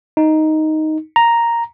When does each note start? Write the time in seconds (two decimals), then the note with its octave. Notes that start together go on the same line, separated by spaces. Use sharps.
0.17 D#4
1.16 A#5